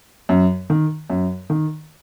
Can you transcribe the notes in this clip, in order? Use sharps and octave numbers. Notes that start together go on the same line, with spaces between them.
F#2
D#3
F#2
D#3